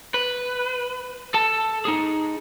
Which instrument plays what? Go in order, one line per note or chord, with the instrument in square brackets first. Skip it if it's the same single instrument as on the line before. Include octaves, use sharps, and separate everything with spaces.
[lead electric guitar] B4
A4 A5
D#4 G#4